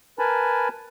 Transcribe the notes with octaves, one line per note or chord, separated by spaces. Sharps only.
A#4 B4 G#5 A5 B5